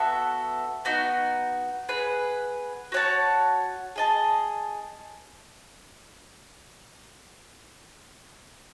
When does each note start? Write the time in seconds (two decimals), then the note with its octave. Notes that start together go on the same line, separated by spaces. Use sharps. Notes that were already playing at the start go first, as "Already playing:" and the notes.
Already playing: B3 F#4 A4 E5
0.85 B3 D#4 F#4
1.89 G#4 B4 F#5
2.92 F#4 C#5 F#5 A5
3.96 G#4 D#5 A5